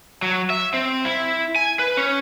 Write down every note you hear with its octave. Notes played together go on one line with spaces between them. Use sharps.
F#3
E5
C4
E4
G#5
B4
C#4